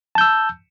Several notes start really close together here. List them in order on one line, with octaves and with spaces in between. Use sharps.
A5 G6 E6